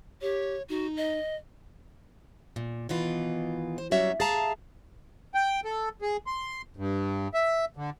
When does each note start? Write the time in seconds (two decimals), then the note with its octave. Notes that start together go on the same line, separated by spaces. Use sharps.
0.21 G4 C#5
0.70 D#4 F#4
0.97 D#5
2.56 A#2
2.89 B2 D#3 E3 F4
3.78 C5
3.91 F#3 G3 C#4 F#4 C#5 E5
4.20 G#4 E5 F5 A5 A#5
5.35 G5
5.65 A4
6.02 G#4
6.27 C6
6.77 G2
7.34 E5
7.77 D3